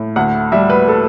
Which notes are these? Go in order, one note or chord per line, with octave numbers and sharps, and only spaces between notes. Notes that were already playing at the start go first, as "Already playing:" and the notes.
Already playing: A2
D2 F#5
G3 E5
B4
A4